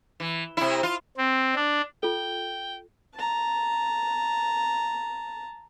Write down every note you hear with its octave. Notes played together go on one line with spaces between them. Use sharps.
E3
C3 E4
F4
C4
D4
F4 A4 G5
A5 A#5